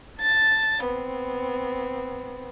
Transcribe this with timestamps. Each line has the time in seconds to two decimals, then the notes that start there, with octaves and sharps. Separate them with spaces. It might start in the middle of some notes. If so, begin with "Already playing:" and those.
0.20 A5 A6
0.85 B3 C4